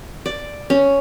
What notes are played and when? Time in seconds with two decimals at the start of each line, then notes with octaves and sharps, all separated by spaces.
0.26 D5
0.70 C#4